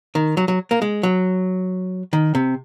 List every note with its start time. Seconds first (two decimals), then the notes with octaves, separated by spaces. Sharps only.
0.15 D#3
0.37 F#3
0.48 F#3
0.71 A#3
0.82 G#3
1.03 F#3
2.13 D#3
2.35 C3